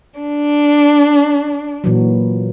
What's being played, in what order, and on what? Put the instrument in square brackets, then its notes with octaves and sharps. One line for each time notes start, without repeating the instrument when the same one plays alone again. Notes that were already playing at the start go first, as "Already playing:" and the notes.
[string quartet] D4
[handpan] A#2 E3 F#3